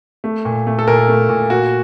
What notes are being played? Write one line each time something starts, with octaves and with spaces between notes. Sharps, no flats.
A3
A#2
A3
A4
A#2 A#4
A3
A#2
A#3 F#4